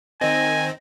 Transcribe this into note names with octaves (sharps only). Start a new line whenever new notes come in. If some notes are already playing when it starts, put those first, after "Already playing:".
D#3 C4 D#5 G#5